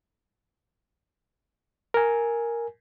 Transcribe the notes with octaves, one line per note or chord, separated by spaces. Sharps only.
A#4 G#5